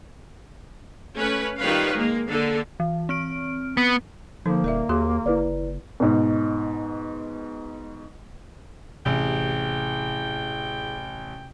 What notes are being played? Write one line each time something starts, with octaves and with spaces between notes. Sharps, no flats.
A3 C#4 B4
D#3 G3 F4 B4 C#5 F5
G#3 A#3
D3 A#3 A4
E3
C4 F6 D7
B3
D3 F3 A#3 D#4 A4
D#1 A#4 D5 E5
D#2 F#4 G#4 C6
F#1 E4 B4 D5
G#2 B2
A1 C3 E4 G#4 G5